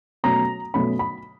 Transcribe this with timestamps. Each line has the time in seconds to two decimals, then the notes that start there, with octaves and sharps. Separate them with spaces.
0.24 B2 F#3 A3 C#4 A#5
0.74 B2 F#3 A3 C#4 B5
0.99 B5